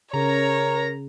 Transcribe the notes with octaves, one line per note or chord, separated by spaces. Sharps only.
C#3 A#4 C#5 A#5